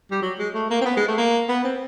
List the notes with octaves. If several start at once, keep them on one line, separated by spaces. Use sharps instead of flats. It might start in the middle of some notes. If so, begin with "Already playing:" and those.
G3
F#3
G#3
A3
A#3
C4
B3
G#3
A3
A#3
B3
C4